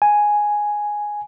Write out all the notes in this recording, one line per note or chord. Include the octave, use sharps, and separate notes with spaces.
G#5